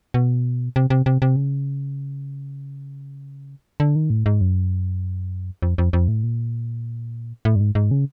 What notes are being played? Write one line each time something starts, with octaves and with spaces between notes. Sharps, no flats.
B2
C3
C3
C3
C3
C#3
D3
D#3
A2
G#2
F#2
F2
F2
F2
A2
A#2
A2
G2
G#2
G#2
C#3